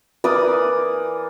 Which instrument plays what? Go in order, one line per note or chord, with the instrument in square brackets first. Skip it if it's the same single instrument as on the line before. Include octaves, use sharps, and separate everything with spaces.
[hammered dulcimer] E3 A#4 B4 [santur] D5 D#6